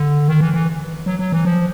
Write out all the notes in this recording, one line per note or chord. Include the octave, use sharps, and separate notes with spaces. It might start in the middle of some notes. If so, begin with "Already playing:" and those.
Already playing: D3
D#3
E3
E3
F#3
F#3
E3
F3